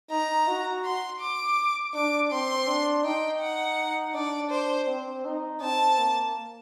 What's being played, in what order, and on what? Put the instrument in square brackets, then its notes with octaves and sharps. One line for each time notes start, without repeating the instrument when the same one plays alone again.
[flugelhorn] D#4 [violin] A#5
[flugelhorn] F#4
[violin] C6
D6
[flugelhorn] D4 [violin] D6
[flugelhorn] C4 [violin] C6
[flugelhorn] D4
[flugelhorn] D#4 [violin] G5
[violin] F#5
[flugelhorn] D4 [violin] D5
[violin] C5
[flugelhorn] C4
D#4
[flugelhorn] C4 [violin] A5
[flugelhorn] A#3